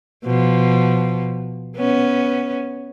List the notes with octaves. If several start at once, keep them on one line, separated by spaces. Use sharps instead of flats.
B2 F3
B3 C#4